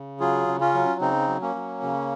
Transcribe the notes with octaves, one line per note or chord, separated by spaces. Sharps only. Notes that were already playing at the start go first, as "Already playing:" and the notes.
Already playing: C#3
F#3 F4 G#4
C#3
C#4 F4
F#3
C#3 C4 D#4
F#3
A#3 C#4
F#3
C#3